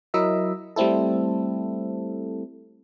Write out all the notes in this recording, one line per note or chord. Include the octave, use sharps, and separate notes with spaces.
F#3 E4 A#4 D#5 E5
G3 A3 C4 E4 A4